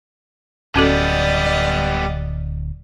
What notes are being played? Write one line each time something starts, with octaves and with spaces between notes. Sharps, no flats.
D1 G3 B3 C#4 F#4 A4 D5 D#5